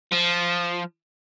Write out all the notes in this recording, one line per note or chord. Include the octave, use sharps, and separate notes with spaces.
F3